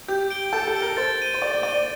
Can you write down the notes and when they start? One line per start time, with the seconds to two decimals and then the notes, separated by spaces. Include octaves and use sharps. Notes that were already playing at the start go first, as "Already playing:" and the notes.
0.08 G4 G6
0.30 D7 G7
0.53 A4 G6
0.68 A4
0.75 D7 G7
0.82 A#4
0.97 C5 A6
1.19 D#7 G7
1.34 C5
1.41 D5 A6
1.63 D5 D#7 G7